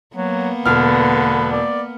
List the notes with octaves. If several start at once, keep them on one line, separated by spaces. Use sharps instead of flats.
F#3 A#3 B3
E1 D3 B4 F6
D5